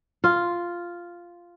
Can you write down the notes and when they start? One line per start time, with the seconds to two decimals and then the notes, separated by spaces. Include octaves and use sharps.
0.24 F4